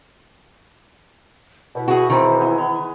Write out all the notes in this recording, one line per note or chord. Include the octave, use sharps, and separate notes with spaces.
B2 E4
F#4 G#4
D#3 E3 G#3 C4 G#4
B3 D#5
B3